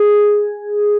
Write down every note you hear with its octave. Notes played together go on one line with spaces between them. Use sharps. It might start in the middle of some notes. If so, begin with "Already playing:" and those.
Already playing: G#4